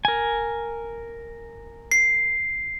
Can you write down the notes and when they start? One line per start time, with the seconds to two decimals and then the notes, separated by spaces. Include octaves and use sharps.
0.05 A#4 G#5
1.91 C7